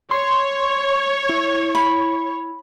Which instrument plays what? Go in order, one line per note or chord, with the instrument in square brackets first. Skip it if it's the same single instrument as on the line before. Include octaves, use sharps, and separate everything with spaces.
[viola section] C#5 [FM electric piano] C6
[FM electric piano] E4
[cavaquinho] B5